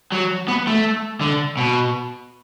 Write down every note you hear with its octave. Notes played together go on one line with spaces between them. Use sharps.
F#3
B3
A3
D3
B2